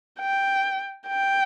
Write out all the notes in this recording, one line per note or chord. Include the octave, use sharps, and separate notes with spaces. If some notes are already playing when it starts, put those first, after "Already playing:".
G5
G5